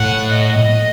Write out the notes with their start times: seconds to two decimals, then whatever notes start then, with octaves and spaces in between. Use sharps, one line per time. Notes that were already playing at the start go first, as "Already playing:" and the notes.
Already playing: A2 F#5
0.33 D#5